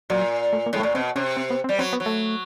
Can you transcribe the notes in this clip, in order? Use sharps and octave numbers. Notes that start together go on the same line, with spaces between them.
A#2 F#3
A3
A#3
A2 G#3
A3
A#2
B2 C4
C3 C#4
C4
B3
C4
G3
F#3 C4
B3
F#3
A3